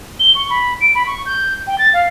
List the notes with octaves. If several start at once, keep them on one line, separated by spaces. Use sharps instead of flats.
G7
C#6
B5
D7
B5
C#6
G6
G5
A6
F5